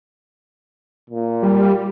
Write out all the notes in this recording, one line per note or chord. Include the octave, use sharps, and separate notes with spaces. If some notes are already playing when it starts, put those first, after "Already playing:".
A#2
G3